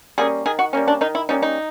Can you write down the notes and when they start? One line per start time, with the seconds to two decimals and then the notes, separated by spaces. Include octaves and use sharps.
0.18 G3 A#3 C#4 G#4
0.46 D#3 G#4
0.59 F#4
0.73 G3 A#3 C#4
0.88 D4
1.01 D#3 D#4
1.15 E4
1.29 G3 A#3 C#4 D#4
1.42 D#4